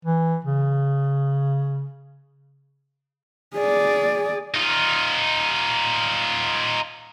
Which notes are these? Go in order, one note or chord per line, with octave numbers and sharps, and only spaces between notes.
E3
C#3
G#4 D5
D#4 F4